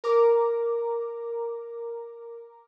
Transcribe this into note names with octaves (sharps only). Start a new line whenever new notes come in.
A#4 A#5 D6